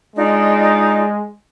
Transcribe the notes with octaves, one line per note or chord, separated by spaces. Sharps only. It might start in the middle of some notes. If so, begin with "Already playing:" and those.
G#3 D4 D#4 F4